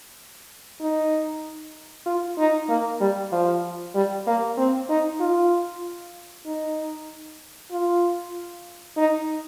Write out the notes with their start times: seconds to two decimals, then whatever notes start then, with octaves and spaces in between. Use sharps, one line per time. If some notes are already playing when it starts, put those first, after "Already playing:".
0.80 D#4
2.06 F4
2.38 D#4
2.69 A#3
3.01 G3
3.32 F3
3.95 G3
4.27 A#3
4.57 C4
4.89 D#4
5.20 F4
6.46 D#4
7.71 F4
8.97 D#4